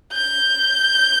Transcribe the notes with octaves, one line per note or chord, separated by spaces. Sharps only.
G6